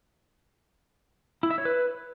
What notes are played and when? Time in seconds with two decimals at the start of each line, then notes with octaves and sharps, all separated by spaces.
1.43 E4
1.51 E5
1.58 C#5
1.65 B4